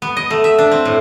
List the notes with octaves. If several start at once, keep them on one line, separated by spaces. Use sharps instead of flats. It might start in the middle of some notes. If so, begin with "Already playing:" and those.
B3
D#5
A3
E5
D4
C4
A2